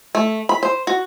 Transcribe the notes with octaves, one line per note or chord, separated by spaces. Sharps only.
A3
B5
C5
F#4